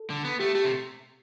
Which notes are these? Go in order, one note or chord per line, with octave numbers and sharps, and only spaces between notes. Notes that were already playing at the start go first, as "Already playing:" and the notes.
Already playing: A4
D3
B3
A3 G4
A3 G4
C3